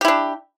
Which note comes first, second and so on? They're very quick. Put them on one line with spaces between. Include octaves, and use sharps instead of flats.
G4 E4 D4